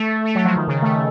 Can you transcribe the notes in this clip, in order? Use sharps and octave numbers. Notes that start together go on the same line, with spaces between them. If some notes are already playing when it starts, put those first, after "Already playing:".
Already playing: A3
A3
F#3
F3
D#3
C#3
A3